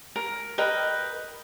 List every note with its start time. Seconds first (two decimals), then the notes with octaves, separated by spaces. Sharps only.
0.16 A#4
0.58 A#4 B4 D#5 G5